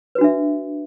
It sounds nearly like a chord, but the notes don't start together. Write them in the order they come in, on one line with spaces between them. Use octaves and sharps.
B4 F#4 D4 E5